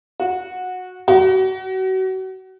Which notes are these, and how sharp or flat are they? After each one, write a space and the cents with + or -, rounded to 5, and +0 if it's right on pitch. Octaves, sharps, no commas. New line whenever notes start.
F#4 -15
F#4 +35